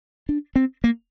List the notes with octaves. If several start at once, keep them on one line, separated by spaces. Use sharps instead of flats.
D4
C4
A#3